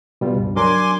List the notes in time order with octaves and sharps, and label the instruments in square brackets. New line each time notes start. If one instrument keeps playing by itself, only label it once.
[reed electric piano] B2 G3 F4
C#2 G2
[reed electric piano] F#3 D4 A#4 [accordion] G#5 C6 D6